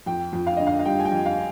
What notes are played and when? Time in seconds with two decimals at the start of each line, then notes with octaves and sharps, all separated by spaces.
0.06 F2 G5
0.33 F2
0.47 F5
0.57 D3 D#5
0.67 F5
0.79 F5
0.85 G3 G5
1.00 G#5
1.05 G5
1.12 F2
1.26 F5